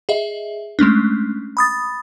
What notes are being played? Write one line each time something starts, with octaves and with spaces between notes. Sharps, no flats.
G#4 D#5 E5
G#3 A3 C#4 D4
B5 D#6 A6